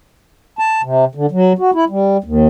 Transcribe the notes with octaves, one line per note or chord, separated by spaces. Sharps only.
A5
C3
D3
F#3
F#4
E4
G3
D#2